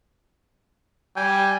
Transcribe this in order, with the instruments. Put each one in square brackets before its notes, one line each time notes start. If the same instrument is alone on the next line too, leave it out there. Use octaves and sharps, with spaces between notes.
[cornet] G3 [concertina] G5 G#5